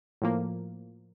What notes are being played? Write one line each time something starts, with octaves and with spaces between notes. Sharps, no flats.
A2 F3 A#3